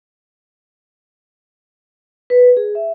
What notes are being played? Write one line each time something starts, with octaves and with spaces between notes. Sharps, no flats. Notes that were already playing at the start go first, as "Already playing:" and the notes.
B4
G#4
E5